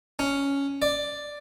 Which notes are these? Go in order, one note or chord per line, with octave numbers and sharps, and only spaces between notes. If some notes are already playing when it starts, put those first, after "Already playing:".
C#4
D5